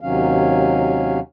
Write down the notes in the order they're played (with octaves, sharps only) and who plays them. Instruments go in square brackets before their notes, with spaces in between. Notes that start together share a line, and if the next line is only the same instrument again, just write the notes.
[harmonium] D#2 C3 D#3 F#3 C#4 F5